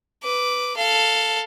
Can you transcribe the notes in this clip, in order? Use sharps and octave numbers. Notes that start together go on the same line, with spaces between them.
B4 D6
A4 F5